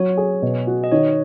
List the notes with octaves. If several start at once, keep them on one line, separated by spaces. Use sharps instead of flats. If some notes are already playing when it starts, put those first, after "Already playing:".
Already playing: F#3 C#5
G#4
B2
F#4
D#5
D#3 C#5